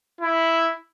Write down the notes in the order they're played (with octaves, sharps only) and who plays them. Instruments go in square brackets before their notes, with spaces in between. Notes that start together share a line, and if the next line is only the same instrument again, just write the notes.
[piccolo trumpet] E4